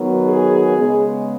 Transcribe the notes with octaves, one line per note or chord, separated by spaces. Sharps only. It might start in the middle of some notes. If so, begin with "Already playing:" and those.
Already playing: D#3 F#3 B3
G#4
C#3 G#3 B3